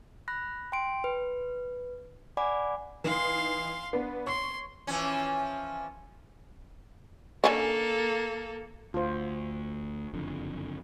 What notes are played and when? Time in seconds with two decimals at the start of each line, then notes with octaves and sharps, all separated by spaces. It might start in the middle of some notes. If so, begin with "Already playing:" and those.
0.28 B5 F#6 A#6
0.72 G5 C6 D7
1.04 B4
2.37 D5 F#5 G#5 B5 D6
3.04 E3 D#4 F5 C6
3.93 B3 D4 B4
4.26 C#5 C6 C#6
4.87 E3 F3 C#4
7.44 D3 A#3 C#4 D4 A4
8.94 D2 F4 C5
10.13 F#1 F2 D3